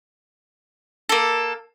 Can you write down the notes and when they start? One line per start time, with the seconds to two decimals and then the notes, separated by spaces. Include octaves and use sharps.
1.09 A#3 A4